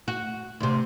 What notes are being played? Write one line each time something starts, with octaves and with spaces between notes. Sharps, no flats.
F#4
D2 C3